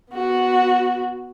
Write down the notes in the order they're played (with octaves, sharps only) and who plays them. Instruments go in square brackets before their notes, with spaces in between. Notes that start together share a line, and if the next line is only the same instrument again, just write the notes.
[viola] B3 F#4